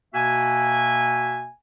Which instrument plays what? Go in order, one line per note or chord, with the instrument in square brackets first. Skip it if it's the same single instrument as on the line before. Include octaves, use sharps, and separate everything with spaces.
[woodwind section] B2 A#3 F#4 E5 G#5